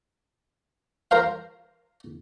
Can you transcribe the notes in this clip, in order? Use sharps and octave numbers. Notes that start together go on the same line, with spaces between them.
A#4 C5 F5